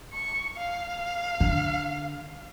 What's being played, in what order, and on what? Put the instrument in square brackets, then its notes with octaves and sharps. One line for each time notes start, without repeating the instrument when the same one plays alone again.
[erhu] C#6
F5
[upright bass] D3